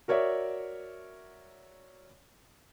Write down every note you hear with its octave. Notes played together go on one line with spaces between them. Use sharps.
F#4 A#4 C#5 D5 E5